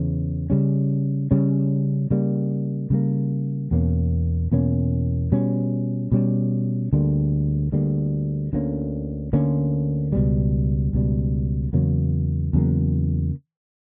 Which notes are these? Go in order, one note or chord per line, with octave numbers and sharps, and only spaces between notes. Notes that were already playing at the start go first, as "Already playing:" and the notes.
Already playing: E2 C#3 E3
C#3 G3 C#4
C#3 G3 C#4
C#3 G3 A#3
C#3 G3 A#3
E2 B2 A#3 C#4
E2 B2 A#3 C#4
B2 G3 C#4
B2 G3 C#4
D2 D3 G3 A#3
D2 D3 G3 A#3
D2 D3 A#3 C#4
D2 D3 A#3 C#4
C#2 B2 G3
C#2 B2 G3
E2 C#3 F#3 A#3
E2 C#3 F#3 A#3